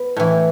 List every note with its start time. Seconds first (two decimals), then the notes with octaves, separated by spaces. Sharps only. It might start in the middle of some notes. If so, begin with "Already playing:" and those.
Already playing: B3
0.16 A2 E3